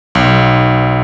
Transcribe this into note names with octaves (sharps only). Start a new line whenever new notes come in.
B1